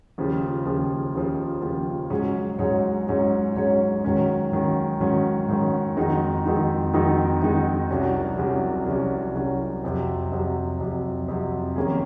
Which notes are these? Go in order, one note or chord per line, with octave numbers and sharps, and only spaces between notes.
D#2 C#3 F3
D#2 C#3 F3
D#2 C#3 F3
D#2 C#3 F3
G#2 F#3 C#4 G#4 C#5
G#2 F#3 C#4 G#4 C#5
G#2 F#3 C#4 G#4 C#5
G#2 F#3 C#4 G#4 C#5
G#2 D#3 F#3 C#4
G#2 D#3 F#3 C#4
G#2 D#3 F#3 C#4
G#2 D#3 F#3 C#4
F2 D#3 G#3 D#4 F#4
F2 D#3 G#3 D#4 F#4
F2 D#3 G#3 D#4 F#4
F2 D#3 G#3 D#4 F#4
C2 C3 F#3 C#4 F#4
C2 C3 F#3 C#4 F#4
C2 C3 F#3 C#4 F#4
C2 C3 F#3 C#4 F#4
F2 C3 F#3
F2 C3 F#3
F2 C3 F#3
F2 C3 F#3
F2 D#3 A#3 C#4 G#4